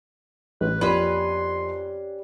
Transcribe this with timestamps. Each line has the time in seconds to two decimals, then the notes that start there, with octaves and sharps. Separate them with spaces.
0.61 A1 B4
0.81 F2 A#3 C#4 G4 B4 D5 C6